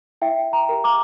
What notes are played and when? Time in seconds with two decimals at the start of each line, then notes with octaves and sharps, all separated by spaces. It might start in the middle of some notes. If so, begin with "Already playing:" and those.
0.22 E4 E5 G5
0.52 G5 A#5
0.69 G4 A#4
0.84 A#5 D6